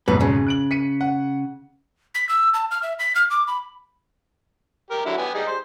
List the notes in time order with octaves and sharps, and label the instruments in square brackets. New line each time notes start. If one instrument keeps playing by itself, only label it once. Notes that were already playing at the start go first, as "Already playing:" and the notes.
[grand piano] B1 F2 G#2 [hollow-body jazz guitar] B3
[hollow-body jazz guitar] C#3
[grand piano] F#6 D7 F#7
B6 C#7 D#7
F#5
[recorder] B6
E6
A5
F6
E5
B6
F6
D6
B5
[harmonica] G4 A#4
D3 F#3 E4
B3 G4 G#5
G3 D#4 G#4
C5